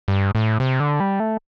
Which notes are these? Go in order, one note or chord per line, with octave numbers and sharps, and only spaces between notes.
G2
A2
C3
D3
G3
A3